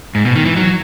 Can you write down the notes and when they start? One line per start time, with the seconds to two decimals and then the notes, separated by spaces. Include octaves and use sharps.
0.15 G#2
0.25 B2
0.36 D#3
0.46 E3
0.56 F#3